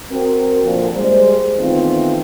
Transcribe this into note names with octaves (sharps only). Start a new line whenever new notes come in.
C4 F#4 A#4
A#2 D3 F3
G3 G#3 G#4 C5
D#3 E3 A3 B3 C4 F4